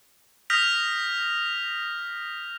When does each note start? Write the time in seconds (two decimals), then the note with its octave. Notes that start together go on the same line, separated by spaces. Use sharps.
0.50 D#6 F6 G6 A#6 B6 F7